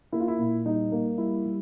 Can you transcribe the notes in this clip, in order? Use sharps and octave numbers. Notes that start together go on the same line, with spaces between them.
A#3 E4
F4
E4
A#2
G3 D#4
A#3
G3 E4
G3